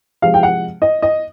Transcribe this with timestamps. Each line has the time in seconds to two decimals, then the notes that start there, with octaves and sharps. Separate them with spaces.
0.22 C3 F3 G#3 F5
0.34 G5
0.43 F#5
0.82 D#5
1.02 D#5